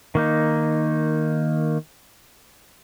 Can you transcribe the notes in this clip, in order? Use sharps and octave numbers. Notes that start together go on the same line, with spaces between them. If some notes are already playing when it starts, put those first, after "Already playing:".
D#3 A#3 D#4